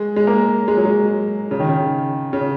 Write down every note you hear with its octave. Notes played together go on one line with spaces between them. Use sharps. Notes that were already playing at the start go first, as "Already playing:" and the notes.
Already playing: G#3
G#3
A#3
G#3
F#3
G#3
C#3
D#3
C#3
C#3